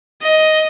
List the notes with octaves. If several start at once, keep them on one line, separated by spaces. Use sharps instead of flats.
D#5